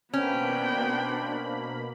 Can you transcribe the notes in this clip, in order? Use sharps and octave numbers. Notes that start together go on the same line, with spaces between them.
B2 A#3 B3 C#4 D4 C5 G5 B5